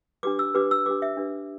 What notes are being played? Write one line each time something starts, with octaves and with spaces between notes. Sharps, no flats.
D4 G4 B4 D6
E6
D4 G4 B4 D6
E6
D4 G4 B4 D6
E5
D4 G4 B4